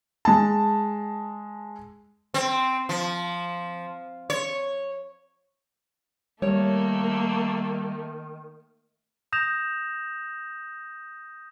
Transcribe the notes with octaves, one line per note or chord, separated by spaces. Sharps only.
G#3 A5
C4
F3
C#5
D#3 G3 A3 A#3 C#5
D#6 G6 A#6 E7 F7